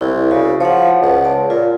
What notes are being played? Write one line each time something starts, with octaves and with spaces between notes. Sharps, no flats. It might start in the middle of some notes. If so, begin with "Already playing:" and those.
C2 E4
C#3 F#4
F3 C#5 F#5
C#2
D5 A5
A#2 F4